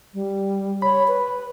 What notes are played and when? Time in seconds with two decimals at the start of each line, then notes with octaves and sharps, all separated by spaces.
0.14 G3
0.82 C#5 B5
1.08 B4